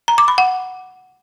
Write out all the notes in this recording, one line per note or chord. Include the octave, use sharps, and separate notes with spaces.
A#5
D6
B5
F#5